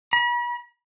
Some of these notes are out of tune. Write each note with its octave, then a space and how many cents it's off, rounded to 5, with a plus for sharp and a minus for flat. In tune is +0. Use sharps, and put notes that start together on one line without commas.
B5 -40